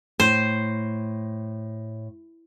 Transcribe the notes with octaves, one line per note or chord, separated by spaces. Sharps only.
A2 C5